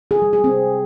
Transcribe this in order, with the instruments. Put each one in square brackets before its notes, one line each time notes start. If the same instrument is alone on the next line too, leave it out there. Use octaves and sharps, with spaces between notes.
[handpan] G#4
G3
G#4
C4